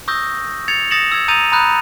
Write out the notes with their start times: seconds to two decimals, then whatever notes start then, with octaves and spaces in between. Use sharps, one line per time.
0.08 C#6 D#6 E6 G6 A#6
0.68 G#6 A6 C#7 F7
0.91 D#6 A6 A#6 C#7 E7 F#7
1.12 E6 G#6
1.28 A#5 D#6 G6 A6 D#7 F7
1.52 A#5 B5 D#6 F#6 G6